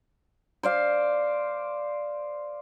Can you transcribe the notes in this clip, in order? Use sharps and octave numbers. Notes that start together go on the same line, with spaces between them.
C5 D5 F5